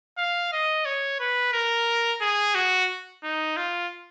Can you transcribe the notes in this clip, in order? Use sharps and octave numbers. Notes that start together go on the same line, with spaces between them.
F5
D#5
C#5
B4
A#4
G#4
F#4
D#4
F4